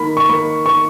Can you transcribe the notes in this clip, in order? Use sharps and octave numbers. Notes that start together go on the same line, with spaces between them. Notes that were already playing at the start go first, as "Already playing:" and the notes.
Already playing: D#3 A#3 B5
C#6
A#3 B5
A#3 C#6